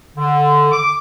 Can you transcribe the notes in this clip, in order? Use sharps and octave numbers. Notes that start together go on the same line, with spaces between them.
D3
D6